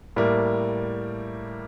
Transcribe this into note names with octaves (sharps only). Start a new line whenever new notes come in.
A2 G3 A#3